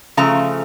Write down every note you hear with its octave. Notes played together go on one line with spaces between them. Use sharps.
C#3 F3 A3 A#5